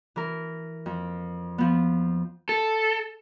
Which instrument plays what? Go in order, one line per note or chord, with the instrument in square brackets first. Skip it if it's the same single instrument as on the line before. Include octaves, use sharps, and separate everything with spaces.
[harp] E3 A#4
F2
F3 B3
[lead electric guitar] A4